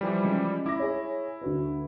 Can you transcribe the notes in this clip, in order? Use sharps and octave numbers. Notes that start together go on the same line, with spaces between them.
E3 F3 G3
C#3 G#3
E4 D6 A#6
G#4 C#5
D2 F#4 B4